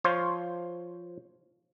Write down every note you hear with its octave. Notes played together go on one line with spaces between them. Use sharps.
F3 F4 C5 C#5